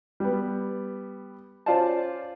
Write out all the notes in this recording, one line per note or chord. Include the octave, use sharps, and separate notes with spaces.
G3 B3
C#4 F4 C5 D5 A5